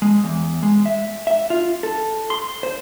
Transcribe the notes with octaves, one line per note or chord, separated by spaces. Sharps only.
G#3
E2
G#3
E5
E5
F4
A4
C6
C5